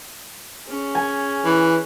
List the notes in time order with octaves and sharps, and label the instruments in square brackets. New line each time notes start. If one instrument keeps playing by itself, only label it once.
[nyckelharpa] C#4 G#4
[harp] G#5
[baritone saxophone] E3